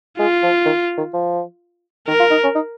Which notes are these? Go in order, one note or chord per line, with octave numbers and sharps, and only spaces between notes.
G#3 F4
F3
D#3
D#3
F3
D#3 A#4
F4
D#4
C#4
D#4